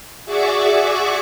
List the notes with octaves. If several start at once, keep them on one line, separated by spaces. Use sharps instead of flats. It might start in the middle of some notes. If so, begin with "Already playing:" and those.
F#4 G#4 D5 E5 C#6 D6